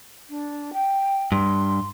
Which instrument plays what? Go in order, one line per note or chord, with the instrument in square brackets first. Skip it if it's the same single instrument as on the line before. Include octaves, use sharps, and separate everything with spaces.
[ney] D4
G5
[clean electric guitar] G2 [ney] C6